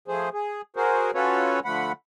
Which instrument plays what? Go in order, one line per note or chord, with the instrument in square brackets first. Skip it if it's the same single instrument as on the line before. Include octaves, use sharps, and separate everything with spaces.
[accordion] F3 A3 G#4 C5
G#4
F#4 G#4 A#4 C5
C#4 F4 F#4 A4 B4 C#5
D3 F3 A3 F#5 B5